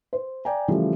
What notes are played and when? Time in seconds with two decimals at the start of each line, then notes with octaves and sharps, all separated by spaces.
0.13 C5
0.45 D5 G5 G#5 A#5
0.68 C#3 E3 F3 G3 A3